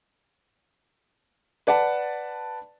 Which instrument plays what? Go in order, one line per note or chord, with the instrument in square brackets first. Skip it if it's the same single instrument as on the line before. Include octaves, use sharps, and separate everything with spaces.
[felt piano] B4 D5 F#5 A5